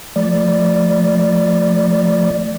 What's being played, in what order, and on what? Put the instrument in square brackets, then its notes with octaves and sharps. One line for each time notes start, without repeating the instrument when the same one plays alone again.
[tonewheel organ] F3 A3 D5